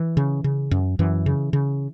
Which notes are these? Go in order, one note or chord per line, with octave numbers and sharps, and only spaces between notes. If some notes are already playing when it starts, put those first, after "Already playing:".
Already playing: E3
C#3
C#3
F#2
F#2 E3
C#3
C#3